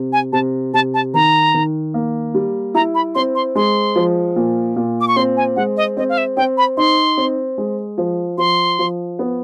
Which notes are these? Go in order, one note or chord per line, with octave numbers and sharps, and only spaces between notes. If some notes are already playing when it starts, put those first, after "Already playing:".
Already playing: C3
G#5
C3 A5
C3 A5
A5
D#3 A#5
D#3
A#3
G3
E4 A#5
B5
C4 C6
C6
G#3 C6
F3
A#2
A#2
D6
C#6
C4 C6
G#5
G#3 F#5
D#5
C4 D#5
F5
E5
C4 G5
B5
D#4 C6
C4
G#3
F3
F3 C6
F3
B3